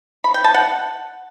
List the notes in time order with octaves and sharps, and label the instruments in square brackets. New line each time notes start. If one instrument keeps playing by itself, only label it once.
[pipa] B5
G5
A5
F#5